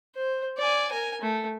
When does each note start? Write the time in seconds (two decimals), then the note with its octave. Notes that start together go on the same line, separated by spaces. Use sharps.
0.15 C5
0.58 D5 G#5
0.91 A#4 G#5
1.21 A3